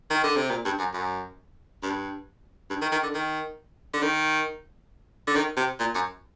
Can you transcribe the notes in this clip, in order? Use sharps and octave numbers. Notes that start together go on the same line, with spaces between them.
D#3
D3
C3
A#2
G2
F#2
F#2
G2
G2
D#3
D#3
D3
D#3
D3
D#3
D3
D#3
C3
A#2
F#2